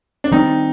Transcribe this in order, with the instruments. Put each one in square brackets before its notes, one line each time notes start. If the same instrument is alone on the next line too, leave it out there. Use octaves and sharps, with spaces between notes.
[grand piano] D4
[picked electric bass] D#3 G3 C4 [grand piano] D#4